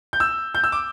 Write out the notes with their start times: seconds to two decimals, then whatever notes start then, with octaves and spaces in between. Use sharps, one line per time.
0.13 G6
0.20 E6
0.55 G6
0.64 E6
0.72 D6